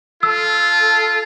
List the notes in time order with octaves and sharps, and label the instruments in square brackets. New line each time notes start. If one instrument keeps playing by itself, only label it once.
[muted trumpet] F4 [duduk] A4 [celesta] E6